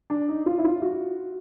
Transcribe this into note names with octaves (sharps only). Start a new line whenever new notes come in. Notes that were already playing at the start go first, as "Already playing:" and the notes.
D4
D#4
F4
E4
F4
F#4